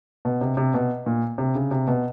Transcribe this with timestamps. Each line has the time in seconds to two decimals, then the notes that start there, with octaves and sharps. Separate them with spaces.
0.25 B2
0.41 C3
0.57 C3
0.74 B2
1.06 A#2
1.38 C3
1.55 C#3
1.71 C3
1.88 B2